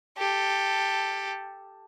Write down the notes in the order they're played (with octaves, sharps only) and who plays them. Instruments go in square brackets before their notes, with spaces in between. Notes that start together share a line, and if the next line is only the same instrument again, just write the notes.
[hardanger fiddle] G4 A4